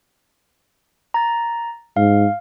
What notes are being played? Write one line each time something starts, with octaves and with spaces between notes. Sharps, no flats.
A#5 A6
G#2 F5